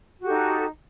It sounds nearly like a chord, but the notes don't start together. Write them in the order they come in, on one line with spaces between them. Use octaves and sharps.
F#4 G4 A4 D#4